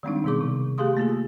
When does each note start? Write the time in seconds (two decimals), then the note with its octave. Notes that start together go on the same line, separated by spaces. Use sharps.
0.03 D#3 G3 G#3 C4 D4 D#4
0.24 B2 D#3 B3 G#4 D6
0.41 C3
0.78 A3 G4 G#4 F5 C6 D#6
0.97 A3 A#3 F4 G#4